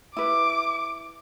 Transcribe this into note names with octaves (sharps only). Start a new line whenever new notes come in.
E4 B4 D6